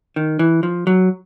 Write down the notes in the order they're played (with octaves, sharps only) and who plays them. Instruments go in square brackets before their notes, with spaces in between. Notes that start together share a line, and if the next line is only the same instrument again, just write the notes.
[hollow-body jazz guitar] D#3
E3
F3
F#3